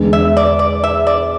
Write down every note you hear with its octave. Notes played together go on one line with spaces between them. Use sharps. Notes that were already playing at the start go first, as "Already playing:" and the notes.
Already playing: E2 D3 G#3
E5
D5
D5
E5
D5